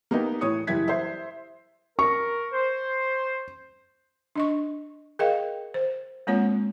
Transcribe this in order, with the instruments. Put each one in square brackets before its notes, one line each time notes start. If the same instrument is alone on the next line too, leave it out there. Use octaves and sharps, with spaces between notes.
[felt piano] A#3 B3 D#4 G4
A2 E3 C#5 D#6 C#7
F#1 E3 G3 E4 G#6 B6
E4 C5 E5
[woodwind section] A#4 [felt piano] C#6
[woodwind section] C5
[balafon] D4 D#5 C#6
G#4 A#4 D#5 F5 G5
C5
G#3 A#3 C4 F4 C#5 F#5